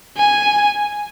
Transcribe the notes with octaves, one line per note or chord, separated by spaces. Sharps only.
G#5